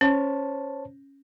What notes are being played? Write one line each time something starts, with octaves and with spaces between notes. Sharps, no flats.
C#4 C5 C#5 A5